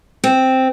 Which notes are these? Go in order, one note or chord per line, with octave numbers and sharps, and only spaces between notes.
C4